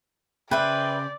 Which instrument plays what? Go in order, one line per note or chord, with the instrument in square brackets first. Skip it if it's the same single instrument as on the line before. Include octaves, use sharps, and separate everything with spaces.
[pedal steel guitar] C#3 C5 [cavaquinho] B4 E5 [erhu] D5 [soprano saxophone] G5